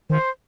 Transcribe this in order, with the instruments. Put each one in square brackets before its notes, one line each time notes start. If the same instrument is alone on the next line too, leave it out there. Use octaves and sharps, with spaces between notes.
[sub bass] D#3 [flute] C5